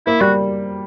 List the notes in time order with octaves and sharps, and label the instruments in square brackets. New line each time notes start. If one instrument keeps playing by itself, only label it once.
[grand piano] A#3 [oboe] E4
[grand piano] G3 [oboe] F#4